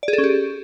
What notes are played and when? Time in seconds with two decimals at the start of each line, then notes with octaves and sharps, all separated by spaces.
0.03 D5
0.08 G#4
0.13 A4
0.18 C#4
0.24 G4